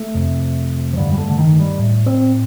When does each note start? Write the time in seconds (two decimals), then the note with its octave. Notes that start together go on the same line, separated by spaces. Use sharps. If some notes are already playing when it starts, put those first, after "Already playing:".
Already playing: A3
0.14 F2 C3
0.93 F3
0.97 G2 D3 G3
1.12 G3
1.18 A3
1.30 D3
1.38 D#3
1.59 G3
1.79 A2
2.06 C4